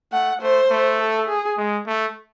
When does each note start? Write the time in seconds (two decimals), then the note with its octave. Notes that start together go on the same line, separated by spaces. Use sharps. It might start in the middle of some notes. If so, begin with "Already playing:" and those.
0.12 A3 F#5
0.41 A3 C5
0.70 A3
0.99 A4
1.28 G#4
1.57 G#3
1.87 A3